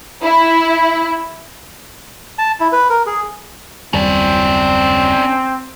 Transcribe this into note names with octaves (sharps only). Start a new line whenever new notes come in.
E4
A5
E4
B4
A#4
G#4
F#1 D#2 G3 C4 C#4 D5